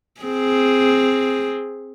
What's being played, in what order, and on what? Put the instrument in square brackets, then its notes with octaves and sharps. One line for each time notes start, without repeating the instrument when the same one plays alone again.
[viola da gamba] C4 G#4